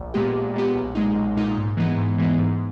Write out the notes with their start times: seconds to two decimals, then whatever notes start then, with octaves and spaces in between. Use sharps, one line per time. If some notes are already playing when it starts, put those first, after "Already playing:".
Already playing: A#1
0.14 A#2 G#3 B3 G4
0.34 A#1
0.54 A#2 G#3 B3 G4
0.75 B1
0.95 A#2 G#3 D#4
1.16 B1
1.37 A#2 G#3 D#4
1.57 G#2
1.77 E3 G#3 B3 D#4
1.97 G#2
2.18 E3 G#3 B3 D#4
2.38 G#2